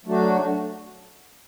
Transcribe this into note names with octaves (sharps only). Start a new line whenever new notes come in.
F#3 A3 D4 F#4